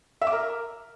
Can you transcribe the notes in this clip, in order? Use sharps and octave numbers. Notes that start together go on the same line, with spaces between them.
E5
D6
A#4